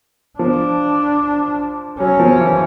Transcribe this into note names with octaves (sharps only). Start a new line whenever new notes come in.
F3 D4
F#3 C#4
F3
E3